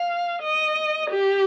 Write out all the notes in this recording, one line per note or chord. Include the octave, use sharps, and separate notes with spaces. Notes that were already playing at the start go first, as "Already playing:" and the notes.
Already playing: F5
D#5
G4